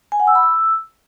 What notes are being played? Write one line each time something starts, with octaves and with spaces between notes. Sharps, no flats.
G#5
F#5
E6
B5
E6